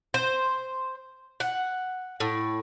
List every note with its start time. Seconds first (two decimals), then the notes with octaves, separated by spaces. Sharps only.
0.14 C5
1.40 F#5
2.20 A2